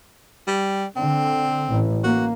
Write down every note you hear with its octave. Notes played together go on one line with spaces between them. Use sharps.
G3
D3 C4
A1
A#3 F#4